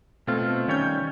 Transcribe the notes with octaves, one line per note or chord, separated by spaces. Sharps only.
B2 A3 C4 F4
D#3 G3 C#4 C#5 G6